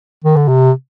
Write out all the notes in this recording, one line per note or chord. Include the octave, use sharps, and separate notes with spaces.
D#3
D3
C3